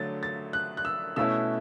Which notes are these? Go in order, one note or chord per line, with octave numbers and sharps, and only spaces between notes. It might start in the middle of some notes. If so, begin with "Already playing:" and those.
Already playing: D3 F#3 A3 A6
A6
F#6
F#6
E6
B2 A3 C#4 E4 E6